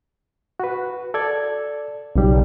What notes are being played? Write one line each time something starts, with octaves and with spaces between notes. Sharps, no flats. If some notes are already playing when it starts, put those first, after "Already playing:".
F#4 B4
A4 D5 G#6
B1 C#3 G3